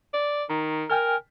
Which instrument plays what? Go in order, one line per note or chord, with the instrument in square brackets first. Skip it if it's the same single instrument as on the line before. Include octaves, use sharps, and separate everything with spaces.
[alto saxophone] D5
[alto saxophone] D#3 [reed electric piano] A#5
[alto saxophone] A#4 [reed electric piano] G5 G#5 F6